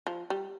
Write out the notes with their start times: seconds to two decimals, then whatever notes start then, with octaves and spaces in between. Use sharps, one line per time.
0.07 F3
0.30 G3